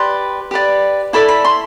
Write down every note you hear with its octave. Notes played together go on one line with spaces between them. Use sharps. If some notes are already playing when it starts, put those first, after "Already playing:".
Already playing: G4 B4 D5 C6
G4 B4 D5
E4 A4 D5 B5
B5
C6